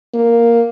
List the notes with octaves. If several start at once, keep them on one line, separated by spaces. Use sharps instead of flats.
A#3